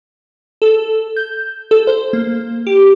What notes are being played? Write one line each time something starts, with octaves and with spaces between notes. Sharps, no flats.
A4
G6
A4
C5
A#3
G4